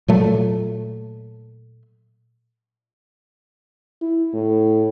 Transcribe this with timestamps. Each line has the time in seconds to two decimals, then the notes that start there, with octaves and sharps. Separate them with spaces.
0.08 A#2 F#3 A3
4.02 E4
4.34 A2